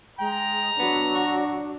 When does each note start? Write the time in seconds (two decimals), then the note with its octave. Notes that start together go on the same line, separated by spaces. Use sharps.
0.19 G#3 G5 A#5
0.79 F#3 B3 D4
1.15 F#4